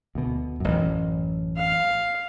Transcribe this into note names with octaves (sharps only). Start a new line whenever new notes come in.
D2 B2
A1 F#2
F5